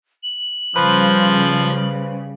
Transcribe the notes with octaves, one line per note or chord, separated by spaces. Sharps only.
F#7
C#3 F3 G3 B4 C5